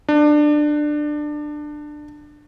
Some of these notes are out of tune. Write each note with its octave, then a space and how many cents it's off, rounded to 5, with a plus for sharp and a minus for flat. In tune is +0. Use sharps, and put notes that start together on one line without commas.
D4 +20